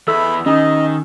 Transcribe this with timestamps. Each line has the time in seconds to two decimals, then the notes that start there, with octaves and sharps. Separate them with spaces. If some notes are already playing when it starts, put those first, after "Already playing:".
0.08 E2 E4 A4 B5 E6
0.46 D#3 C#4 D#5 G#5 D#6